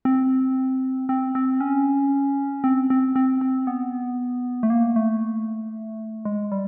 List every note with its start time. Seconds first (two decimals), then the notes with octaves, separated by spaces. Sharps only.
0.05 C4
1.09 C4
1.35 C4
1.61 C#4
2.64 C4
2.90 C4
3.16 C4
3.41 C4
3.67 B3
4.63 A3
4.70 A#3
4.96 A3
6.25 G#3
6.52 G3